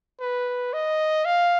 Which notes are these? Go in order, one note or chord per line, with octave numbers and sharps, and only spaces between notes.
B4
D#5
F5